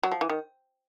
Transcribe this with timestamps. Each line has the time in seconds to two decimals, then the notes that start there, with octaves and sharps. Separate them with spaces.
0.03 F#3
0.12 F3
0.21 E3
0.29 D#3